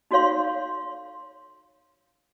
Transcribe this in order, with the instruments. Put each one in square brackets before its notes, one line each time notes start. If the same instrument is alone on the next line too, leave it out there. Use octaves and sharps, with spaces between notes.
[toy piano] D#4 F#4 A4 C#5 F5 C6